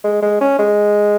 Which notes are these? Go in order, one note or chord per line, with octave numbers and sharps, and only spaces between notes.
G#3
G#3
C#4
G#3